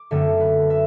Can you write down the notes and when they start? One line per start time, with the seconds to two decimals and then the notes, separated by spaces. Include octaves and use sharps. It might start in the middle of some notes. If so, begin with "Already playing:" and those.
Already playing: D6
0.11 F#2 D3 A3 C4 E5
0.40 B4
0.70 E5